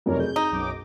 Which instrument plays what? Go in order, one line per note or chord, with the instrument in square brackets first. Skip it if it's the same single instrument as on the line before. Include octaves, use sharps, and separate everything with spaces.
[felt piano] F1 B1 F2 [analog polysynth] A#4 C#5 D5
[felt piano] G#4 [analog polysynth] G6
[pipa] D#4
[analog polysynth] B1 F#2 D6